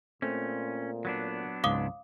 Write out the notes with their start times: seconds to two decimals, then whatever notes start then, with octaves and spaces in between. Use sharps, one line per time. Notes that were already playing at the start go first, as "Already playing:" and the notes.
0.22 A#2 A3 C4 C#4
1.05 F#3 B3 D4
1.64 C#2 G#2 F5 D6 D#6